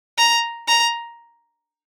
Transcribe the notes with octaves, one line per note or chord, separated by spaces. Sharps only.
A#5
A#5